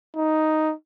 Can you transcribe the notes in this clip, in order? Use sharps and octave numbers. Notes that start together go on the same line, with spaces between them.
D#4